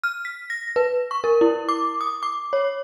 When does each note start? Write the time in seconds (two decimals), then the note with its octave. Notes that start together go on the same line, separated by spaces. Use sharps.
0.04 F6
0.25 B6
0.50 A#6
0.76 B4
1.11 C#6
1.24 A#4
1.41 E4
1.69 D6
2.01 D#6
2.23 D6
2.53 C#5